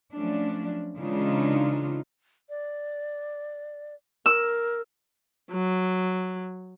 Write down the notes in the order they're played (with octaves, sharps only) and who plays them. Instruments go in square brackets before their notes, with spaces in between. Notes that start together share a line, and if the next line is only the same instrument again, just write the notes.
[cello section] F3 F#3 A3 C#4 D4
C#3 E3 G#3 D4 D#4 F4
[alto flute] D5
[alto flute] A#4 [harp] E6
[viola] F#3